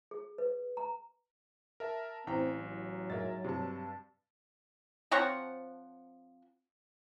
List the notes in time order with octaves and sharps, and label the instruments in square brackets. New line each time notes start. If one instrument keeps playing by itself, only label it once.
[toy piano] G#4
B4
A#5
[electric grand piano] A#4 E5 A5
[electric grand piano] A1 [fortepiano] E3 G5 A#5 [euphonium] C4
[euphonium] F#3
[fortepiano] G#2 [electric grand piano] A#4 E5 A6
[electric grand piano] G2 A5 [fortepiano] C3
[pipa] F3 C4 C#5 F#5